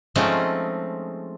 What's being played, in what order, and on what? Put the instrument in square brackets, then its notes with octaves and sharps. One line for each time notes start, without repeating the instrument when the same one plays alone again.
[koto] F3 G#3 A3 C4 C#4 D#4